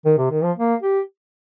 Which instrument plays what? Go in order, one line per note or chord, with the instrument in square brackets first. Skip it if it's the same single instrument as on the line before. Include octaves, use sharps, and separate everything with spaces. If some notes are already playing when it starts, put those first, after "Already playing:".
[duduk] D#3
C3
D#3
F3
A#3
G4